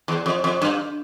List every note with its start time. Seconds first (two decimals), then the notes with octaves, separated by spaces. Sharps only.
0.08 E2
0.26 F2
0.44 F2
0.62 G2